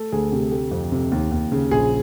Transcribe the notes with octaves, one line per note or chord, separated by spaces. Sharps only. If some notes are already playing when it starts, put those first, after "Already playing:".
Already playing: A3 A4
D2 G#4
C3 G4
A3 G4
F2
C3
D#2
D#2
C#3
A#1 G#4